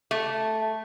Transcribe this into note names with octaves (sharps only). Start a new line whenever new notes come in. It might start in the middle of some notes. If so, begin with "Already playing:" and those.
A3